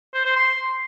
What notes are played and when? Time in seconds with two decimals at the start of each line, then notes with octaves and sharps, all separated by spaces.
0.14 C5
0.25 C5
0.36 C6